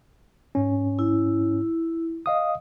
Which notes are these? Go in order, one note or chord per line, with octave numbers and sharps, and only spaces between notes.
G#2 C#4
E4
D#5 F5 D#6